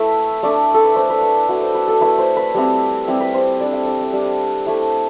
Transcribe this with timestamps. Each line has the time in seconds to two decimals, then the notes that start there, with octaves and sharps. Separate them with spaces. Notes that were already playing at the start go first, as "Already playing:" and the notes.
Already playing: A3 E4 B4 E5
0.43 A3 D4 D5
0.74 A4
0.84 B4
0.95 A3 D4 C5
1.10 B4
1.23 B4
1.49 A3 E4 F#4
1.61 C5
1.75 B4
1.88 A4
2.01 A3 E4 B4
2.19 C5
2.37 B4
2.54 G3 C4 E4
3.08 G3 C4 E4
3.20 B4
3.34 C5
3.61 G3 D4 D5
3.73 E5
3.87 D5
4.00 D5
4.13 G3 D4
4.66 A3 E4